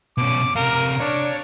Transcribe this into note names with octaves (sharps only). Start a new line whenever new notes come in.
B2 C#4 D6
C3 A#4 F5
D4 C#5